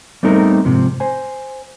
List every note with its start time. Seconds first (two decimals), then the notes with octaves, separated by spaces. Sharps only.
0.23 G3 A3 B3 C4 D#4 A#4
0.65 G#2 C3 F3
1.00 C5 G#5